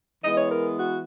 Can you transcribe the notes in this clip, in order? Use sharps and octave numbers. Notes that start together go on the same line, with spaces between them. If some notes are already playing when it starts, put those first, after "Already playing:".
E3 G#3 B3 D#5
C#5
A#4
F#4